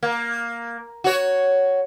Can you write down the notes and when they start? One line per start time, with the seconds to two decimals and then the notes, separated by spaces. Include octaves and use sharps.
0.03 A#3
1.04 F#4 C#5